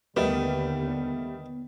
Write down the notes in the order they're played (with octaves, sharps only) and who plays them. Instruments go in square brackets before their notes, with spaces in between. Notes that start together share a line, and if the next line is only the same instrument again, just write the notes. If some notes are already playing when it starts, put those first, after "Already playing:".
[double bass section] D#2 D3 [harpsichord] D#3 [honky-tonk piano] G3 A3 [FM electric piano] B3